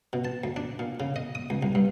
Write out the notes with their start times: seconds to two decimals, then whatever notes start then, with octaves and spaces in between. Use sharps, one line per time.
0.13 B2
0.25 A5
0.44 D2
0.56 D4
0.79 A#2
1.00 C#3
1.16 D#5
1.35 D#6
1.50 C#2
1.63 C2
1.75 G2